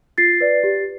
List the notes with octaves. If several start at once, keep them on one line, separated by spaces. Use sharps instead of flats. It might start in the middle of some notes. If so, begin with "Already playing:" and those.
F4 A6 C7
B4 D5
G4